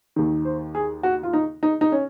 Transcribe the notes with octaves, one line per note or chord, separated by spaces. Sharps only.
D#2 D#3
C5
G#4
F#4
F4
D#4
D#4
D#4
C#4